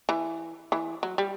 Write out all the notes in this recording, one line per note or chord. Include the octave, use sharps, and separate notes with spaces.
E3
E3
F#3
G3